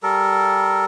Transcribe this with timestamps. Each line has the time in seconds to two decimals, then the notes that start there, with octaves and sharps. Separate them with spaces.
0.03 G3 A4 A#4